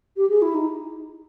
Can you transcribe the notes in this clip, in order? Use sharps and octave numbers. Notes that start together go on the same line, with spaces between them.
G4
G#4
E4
D#4